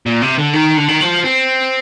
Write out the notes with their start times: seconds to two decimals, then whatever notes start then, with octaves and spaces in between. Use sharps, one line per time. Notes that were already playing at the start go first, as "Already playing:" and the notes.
0.06 A#2
0.22 C3
0.38 D3
0.53 D#3
0.77 D3
0.88 D#3
1.01 F3
1.25 C4